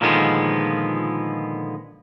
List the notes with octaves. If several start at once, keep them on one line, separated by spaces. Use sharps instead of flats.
A#2 D3 D#3 F3 G#3 B3